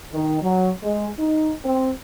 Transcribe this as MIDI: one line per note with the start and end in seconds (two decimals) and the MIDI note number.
0.12 0.39 51
0.42 0.70 54
0.83 1.09 56
1.18 1.52 63
1.65 1.90 60